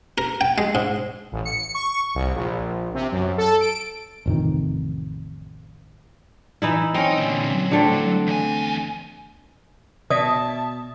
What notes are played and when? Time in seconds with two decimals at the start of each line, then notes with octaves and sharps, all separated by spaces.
0.18 A#4
0.41 G5
0.58 G#3
0.75 G#2
1.32 A1
1.45 C#7
1.75 C#6
2.15 C2
2.36 A#1
2.95 C3
3.12 F#2
3.38 A4
3.61 D7
4.26 A1 F2 C3 D#3
6.62 E3 D#4 E4
6.95 C4 C#4 D#4
7.19 A#2 D3
7.54 F#3
7.71 D3 A3 C4
8.27 E2 G#5
10.10 B2 D5 E5 A5 D#6